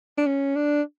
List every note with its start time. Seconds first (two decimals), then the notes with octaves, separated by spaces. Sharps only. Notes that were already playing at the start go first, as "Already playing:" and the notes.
0.18 D4
0.27 C#4
0.56 D4